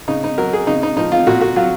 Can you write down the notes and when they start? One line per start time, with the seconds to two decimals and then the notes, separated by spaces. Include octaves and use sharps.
0.08 C#3 D#4
0.24 D#4
0.38 F#3 A#4
0.53 G#4
0.67 C#3 D#4
0.83 D#4
0.97 F3 D#4
1.12 F4
1.27 A#2 F#4
1.41 F#4
1.56 F#3 F4